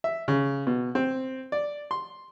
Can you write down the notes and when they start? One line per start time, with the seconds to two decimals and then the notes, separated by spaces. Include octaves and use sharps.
0.04 E5
0.28 C#3
0.67 B2
0.95 C4
1.52 D5
1.91 C6